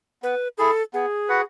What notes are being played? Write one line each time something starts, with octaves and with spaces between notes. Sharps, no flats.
B3 B4
E4 G#4 A4
B3 G#4
F#4 B4 F#5